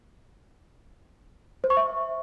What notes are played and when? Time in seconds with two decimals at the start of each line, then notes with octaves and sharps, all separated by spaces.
1.64 C5
1.70 C#6
1.77 E5